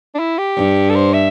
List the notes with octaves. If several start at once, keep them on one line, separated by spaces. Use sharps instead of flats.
D4
E4
G4
G2
A4
C5
E5